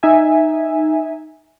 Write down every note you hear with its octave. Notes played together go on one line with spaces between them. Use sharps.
D#4 E5 G#5